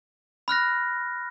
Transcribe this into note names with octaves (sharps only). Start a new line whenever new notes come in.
B5 F6 F#6 A#6